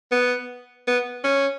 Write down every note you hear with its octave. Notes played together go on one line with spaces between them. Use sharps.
B3
B3
C#4